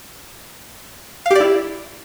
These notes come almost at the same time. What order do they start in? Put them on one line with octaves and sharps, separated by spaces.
F5 G4 D5 E4